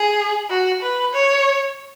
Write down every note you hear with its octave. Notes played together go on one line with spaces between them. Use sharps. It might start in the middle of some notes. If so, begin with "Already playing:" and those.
Already playing: G#4
F#4
B4
C#5